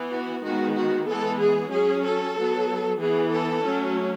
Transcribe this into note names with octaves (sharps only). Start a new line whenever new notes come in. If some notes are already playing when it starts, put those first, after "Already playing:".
Already playing: E3 B3
F#4
D#3 G#3 B3 F#4
F#4
E3 G#3 B3 A4
G#4
F#3 C#4 G#4
A4
F#3 B3
E3 B3 G#4
A4
F#3 A3 C#4